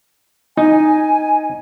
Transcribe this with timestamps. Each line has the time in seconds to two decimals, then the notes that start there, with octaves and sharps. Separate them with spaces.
0.57 D#4 G#5